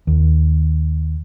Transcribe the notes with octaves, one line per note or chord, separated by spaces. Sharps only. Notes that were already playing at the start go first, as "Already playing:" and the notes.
D#2